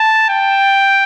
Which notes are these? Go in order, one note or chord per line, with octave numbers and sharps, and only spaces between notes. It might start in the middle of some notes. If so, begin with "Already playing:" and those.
Already playing: A5
G5